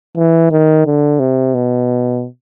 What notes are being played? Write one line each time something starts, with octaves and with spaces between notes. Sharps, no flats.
E3
D#3
D3
C3
B2